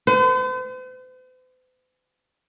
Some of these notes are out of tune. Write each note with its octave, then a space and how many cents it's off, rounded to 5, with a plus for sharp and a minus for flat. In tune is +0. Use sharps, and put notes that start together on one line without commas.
C5 -45